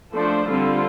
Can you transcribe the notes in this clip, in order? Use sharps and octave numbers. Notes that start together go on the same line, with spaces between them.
F3 A3 D4 A4 C5
D3 G3 C4 F4 A4